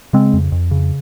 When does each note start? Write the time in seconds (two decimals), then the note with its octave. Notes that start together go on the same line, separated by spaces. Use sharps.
0.13 C#3 G#3 C4
0.33 F2
0.52 F2
0.71 C#3